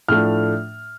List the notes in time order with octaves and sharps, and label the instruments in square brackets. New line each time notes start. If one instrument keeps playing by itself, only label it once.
[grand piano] A2 F3 A3 D4 F6